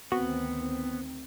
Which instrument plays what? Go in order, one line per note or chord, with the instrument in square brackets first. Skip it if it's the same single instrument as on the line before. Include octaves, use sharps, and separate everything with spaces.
[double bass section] D2 D#3 C4 [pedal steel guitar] B3 [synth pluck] F#4